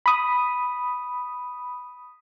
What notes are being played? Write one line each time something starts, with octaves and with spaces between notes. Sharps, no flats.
B5 D#6